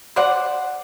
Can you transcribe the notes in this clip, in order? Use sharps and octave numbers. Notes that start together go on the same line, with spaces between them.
C5 D5 F#5